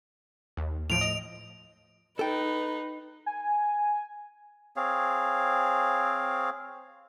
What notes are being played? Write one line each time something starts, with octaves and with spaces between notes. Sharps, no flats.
D#2
A2 F3 D7 F7
D#5
D#4 A4 B4 G5
G#5
C4 G#4 C#5 F5